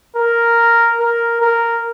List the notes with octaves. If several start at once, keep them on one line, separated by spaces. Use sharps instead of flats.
A#4
A#4
A#4